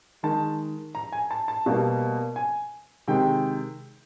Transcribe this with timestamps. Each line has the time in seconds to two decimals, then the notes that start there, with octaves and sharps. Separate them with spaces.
0.23 D#3 G#3 A5
0.95 A#5
1.12 G#5
1.31 A5
1.48 A5
1.66 B2 G3 A#3
2.36 G#5
3.07 C3 D#3 G#3 G5